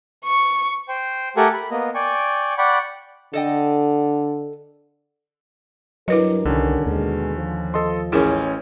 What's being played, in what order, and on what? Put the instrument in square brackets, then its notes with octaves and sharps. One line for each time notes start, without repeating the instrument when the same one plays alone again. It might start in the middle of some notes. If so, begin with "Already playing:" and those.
[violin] C#6
[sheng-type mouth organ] C5 G5
A3 G4 A4 A#4 F#5 G#5
B5
A#3 B3 D#5
D5 G5 G#5 C#6
D5 F#5 G5 B5 C#6
[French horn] D3 [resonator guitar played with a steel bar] A4 D#5 G5
[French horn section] G2 A#4 [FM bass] F#3 [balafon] E4 B4 D#5
[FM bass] C2 [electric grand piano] D3 D#3 C#4
[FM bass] D#2 [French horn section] B2 G#3
[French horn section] F3
[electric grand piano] A4 D#5 C6
[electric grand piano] A1 C#4 [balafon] E4 G#4 A#4